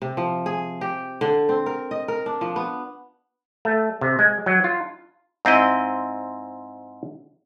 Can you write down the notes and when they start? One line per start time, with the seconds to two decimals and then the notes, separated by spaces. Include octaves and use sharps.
0.02 C3
0.17 F3
0.46 G#4
0.81 G4
1.21 D3
1.49 C4
1.66 A#4
1.91 D#5
2.08 A#4
2.26 D4
2.41 F3
2.56 B3
3.65 A3
4.01 C3
4.19 G#3
4.46 F#3
4.64 F4
5.45 G#2 C4 E4 D#5